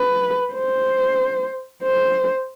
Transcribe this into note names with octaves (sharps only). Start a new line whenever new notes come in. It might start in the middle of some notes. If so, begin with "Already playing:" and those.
Already playing: B4
C5
C5